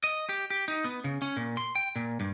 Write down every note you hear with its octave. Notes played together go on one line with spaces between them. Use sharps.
D#5
G4
G4
D#4
B3
C#3
C#4
A#2
C6
G5
A#2
G2